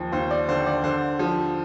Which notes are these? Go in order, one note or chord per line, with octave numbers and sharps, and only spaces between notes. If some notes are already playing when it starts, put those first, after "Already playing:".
Already playing: D#2 F3
D#2 C5
D5
D3 C5
D5
D3 C5
F3